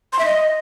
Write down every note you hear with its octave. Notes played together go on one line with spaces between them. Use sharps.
C6
E5
D#5